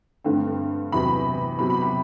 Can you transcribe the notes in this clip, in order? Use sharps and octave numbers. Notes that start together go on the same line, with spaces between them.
G2 D3 A3 C4
E2 C3 F#3 B5
C3 F#3 B3 B5
B5
B5